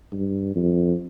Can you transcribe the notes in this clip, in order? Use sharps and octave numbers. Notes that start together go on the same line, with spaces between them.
G2
F2